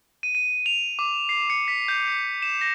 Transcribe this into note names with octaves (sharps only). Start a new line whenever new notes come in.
D#7
D#7
F7
D6
C7
C#7
B6
G6
C#7
E7
A#6